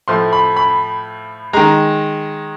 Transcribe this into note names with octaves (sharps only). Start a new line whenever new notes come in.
A2 F3 A3 C6
B5
B5
D#3 G#3 A#5